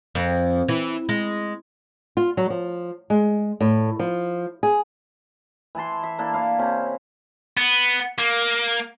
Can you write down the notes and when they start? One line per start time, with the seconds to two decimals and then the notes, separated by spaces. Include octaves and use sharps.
0.15 F2
0.69 E3
1.09 G#3
2.17 F4
2.37 F#3
2.50 F3
3.10 G#3
3.61 A2
3.99 F3
4.63 G#4
5.75 E3 E4 A5 C6
6.03 E5
6.19 A#3 D4 E4 A4
6.34 D4 E4 F5
6.59 C3 A#3 C#4
7.57 B3
8.18 A#3